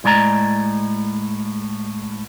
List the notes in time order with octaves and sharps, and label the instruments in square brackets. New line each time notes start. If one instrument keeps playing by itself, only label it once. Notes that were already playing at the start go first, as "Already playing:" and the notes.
[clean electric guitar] A2 G#3 D5 A#5